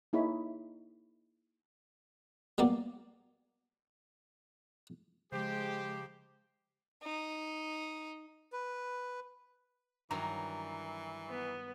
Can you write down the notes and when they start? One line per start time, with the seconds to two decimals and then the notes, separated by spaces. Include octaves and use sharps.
0.13 A#3 D#4 E4 G#4 C#5 B5
2.58 F#3 G3 A#3 B3 D5
5.32 C#3 F3 G#3 G4 C5
7.03 D#4
8.52 B4
10.11 G2 D#3 E3 F#3 A#5
11.29 B3